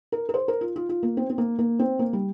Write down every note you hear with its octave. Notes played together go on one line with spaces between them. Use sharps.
A#4
A#4
C5
A#4
F4
F4
F4
A#3
C4
C4
A#3
A#3
C4
A#3
G3